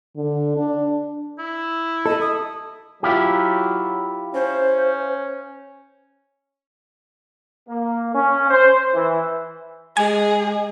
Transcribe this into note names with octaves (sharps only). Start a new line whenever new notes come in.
D3
D4
E4
A4 D#5
D#6
F#3 E4 F4 G4
C#4 C5
A#3
C#4
C5
E3
G#3 G#4 G#5